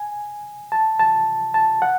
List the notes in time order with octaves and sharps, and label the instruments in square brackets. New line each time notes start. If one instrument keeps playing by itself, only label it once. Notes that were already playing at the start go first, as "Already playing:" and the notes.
Already playing: [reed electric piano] G#5
A5
A5
A5
F#5